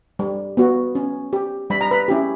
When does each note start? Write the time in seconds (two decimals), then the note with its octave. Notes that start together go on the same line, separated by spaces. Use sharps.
0.19 G3
0.57 B3 F#4
0.95 C#4
1.33 G4
1.70 G3 B5
1.81 A#5
1.91 B4 B5
2.08 C#4 E4 G4